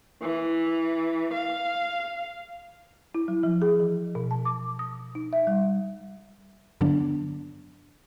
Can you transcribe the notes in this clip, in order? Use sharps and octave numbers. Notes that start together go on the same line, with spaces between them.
E3
F5
E4
F#3
F3
G#4
E3
B2
A5
D6
D#6
D#4
E5
G3
G2 D3 F#3 B3 D4